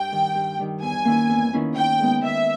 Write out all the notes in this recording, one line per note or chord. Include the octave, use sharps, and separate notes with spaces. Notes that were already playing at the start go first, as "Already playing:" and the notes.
Already playing: G2 G5
D#3 G3
G2
D#3 G3
E2 G#5
D#3 A#3 C#4 E4
E2
D#3 A#3 C#4 E4
D#3 G5
G#3 B3 D#4
D#3 E5